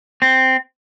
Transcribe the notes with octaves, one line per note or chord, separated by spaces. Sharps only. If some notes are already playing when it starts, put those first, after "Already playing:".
C4